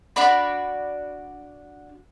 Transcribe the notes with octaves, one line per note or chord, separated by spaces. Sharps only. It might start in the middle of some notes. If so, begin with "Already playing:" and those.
D4 F#4 D5 B5